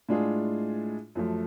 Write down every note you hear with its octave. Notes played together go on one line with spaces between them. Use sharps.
A2 G#3 D4 F4 G#4
F#2 F3 A3